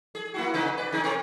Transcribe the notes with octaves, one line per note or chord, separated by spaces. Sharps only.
G#4
A#3 E4 F#4
C3 D#4 B4
B4 D5
C3 D#4 G#4
C4 C#4 A#4